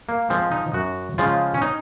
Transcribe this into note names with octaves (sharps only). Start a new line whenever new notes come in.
A#3
F3 G#3 C4
D#4
F#2 F#4
C#3 F3 G#3 F4
C#4
D#4